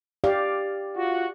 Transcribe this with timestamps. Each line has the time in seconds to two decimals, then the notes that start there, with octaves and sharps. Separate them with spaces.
0.24 G4 D5 F5
0.96 F4 F#4